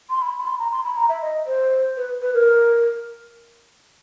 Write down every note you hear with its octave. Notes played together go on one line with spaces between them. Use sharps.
C6
B5
B5
C6
A#5
C6
B5
A#5
E5
D#5
C5
B4
B4
A#4